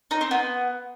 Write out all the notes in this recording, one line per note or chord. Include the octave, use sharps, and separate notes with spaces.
D#4
C4
B3